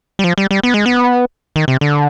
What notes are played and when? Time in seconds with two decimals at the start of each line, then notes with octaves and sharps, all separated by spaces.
0.19 G3
0.24 F3
0.38 G3
0.51 G3
0.63 B3
0.74 G#3
0.86 B3
1.56 D#3
1.68 C3
1.81 D3